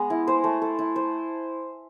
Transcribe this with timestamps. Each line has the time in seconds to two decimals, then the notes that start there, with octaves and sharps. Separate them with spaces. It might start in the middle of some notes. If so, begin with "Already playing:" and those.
Already playing: G#3 B3
0.10 E4
0.27 C5
0.44 A3
0.62 A4
0.79 E4
0.96 C5